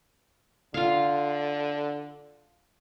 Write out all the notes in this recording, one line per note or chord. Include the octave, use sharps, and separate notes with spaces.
D3 F4 F5